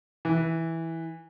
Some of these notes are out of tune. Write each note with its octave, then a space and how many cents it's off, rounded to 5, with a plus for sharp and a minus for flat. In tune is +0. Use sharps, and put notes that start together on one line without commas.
E3 -10